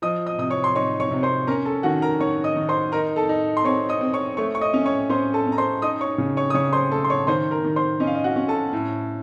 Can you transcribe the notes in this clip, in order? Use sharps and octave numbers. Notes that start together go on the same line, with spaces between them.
F3 D#5 D#6
D#5 D#6
C3 D#6
C#5 C#6
C6
D#4 C#5 C#6
C#5 C#6
C3
C5 C6
C#4 A#4 A#5
A4 A5
D#3 F#4 F#5
A#4 A#5
D#3 C#5 C#6
D#5 D#6
D#3
C5 C6
D#4 A#4 A#5
A4 A5
D#4
C6
C4 C#5 C#6
D#5 D#6
C4
C#5 C#6
A3 C#5 C#6
C#6
D#5 D#6
C#4
C#5 C#6
C#4 C5 C6
A4 A5
C#4
A#5
C5 C6
D#4 D#5 D#6
C#5 C#6
C#3
C#5 C#6
D#6
C#3 C#5 C#6
C5 C6
A3 A4 A5
C6
C#5 C#6
D#3 C5 C6
A#4 A#5
D#3
C5 C6
C#4 D#5
F5
D#5
F#4 F#5
C#4
A4 A5
A2